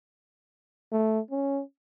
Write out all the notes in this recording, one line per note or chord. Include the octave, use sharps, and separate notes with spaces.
A3
C#4